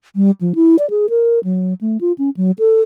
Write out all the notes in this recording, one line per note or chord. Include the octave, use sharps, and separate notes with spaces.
G3
F3
E4
D5
G#4
A#4
F#3
A3
F4
C#4
F#3
A4